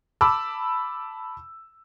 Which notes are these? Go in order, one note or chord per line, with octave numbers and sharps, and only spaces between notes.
A5 B5 D6 E6